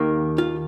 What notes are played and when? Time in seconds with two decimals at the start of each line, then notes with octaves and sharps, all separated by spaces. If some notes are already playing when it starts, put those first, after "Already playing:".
Already playing: D#2 D#3 A#3
0.38 F4